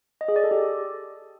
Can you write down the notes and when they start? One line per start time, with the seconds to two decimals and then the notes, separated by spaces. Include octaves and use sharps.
0.21 D#5
0.28 G#4
0.36 D5
0.44 A4
0.51 G4